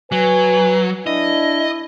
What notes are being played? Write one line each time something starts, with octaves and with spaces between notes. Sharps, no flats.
F#3 B4 G#5
D4 E4 D#5